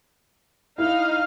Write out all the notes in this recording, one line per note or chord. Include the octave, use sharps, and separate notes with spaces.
D#4 E4 F5